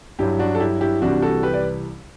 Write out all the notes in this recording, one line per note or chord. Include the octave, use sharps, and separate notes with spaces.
G2 F#3 E4 G4
D4 F#4
A4
E4 G4
E4 G4
C2 C3 E3 G3 D4 F#4
F#4 A4
G4 B4
D5